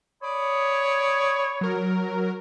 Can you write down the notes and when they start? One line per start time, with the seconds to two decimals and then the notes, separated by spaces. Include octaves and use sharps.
0.23 C#5 D5 B5 D#6
1.61 F#3 A#4